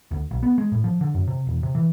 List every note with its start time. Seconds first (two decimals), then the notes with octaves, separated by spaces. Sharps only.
0.11 D2
0.31 B1
0.43 B3
0.58 G#3
0.72 A2
0.84 F3
1.01 D3
1.14 F#2
1.27 C3
1.47 E1
1.63 C3
1.75 E3